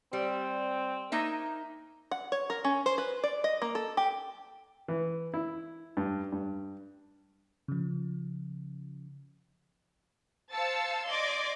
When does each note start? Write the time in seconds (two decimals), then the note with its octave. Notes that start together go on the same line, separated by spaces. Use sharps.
0.13 G3 C4
1.12 A#3 D#4 E5
2.11 F#5
2.32 C#5
2.50 A#4
2.64 C#4
2.86 C5
2.98 B4
3.24 D5
3.44 D#5
3.62 A#3
3.75 A4
3.97 G4
4.88 E3
5.34 E4
5.97 G2
6.32 G2
7.68 C#3 F3
10.54 C5 F5 A5 E6 A6 C#7
11.08 D5 D#5 C6 D6 G#6 A#6